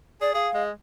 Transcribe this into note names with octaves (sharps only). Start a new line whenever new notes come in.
G#4 D5
G#4 F5
G#3